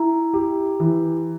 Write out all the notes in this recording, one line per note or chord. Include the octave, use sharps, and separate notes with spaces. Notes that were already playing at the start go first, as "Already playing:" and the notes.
Already playing: E4 A#5
G4
E3